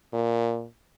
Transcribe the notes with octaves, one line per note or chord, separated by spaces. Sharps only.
A#2